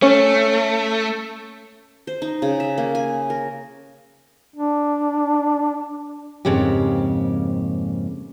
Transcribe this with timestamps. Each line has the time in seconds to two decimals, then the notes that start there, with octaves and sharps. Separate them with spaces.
0.02 A3 C#4
2.07 C5
2.22 D#4
2.42 C#3
2.60 E5
2.78 A#3
2.95 G#5
3.30 A#4
4.56 D4
6.45 F2 G#2 C#3 A#3 G4